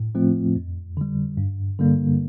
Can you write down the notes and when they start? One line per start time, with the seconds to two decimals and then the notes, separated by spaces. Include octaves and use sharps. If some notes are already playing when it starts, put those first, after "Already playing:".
Already playing: A2
0.15 F3 A3 C4 F4
0.56 F2
0.97 D3 G3
1.37 G2
1.79 D3 G3 A#3